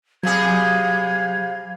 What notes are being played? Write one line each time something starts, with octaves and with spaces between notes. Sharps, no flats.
C3 F#3 G3 G#4 F5 G#6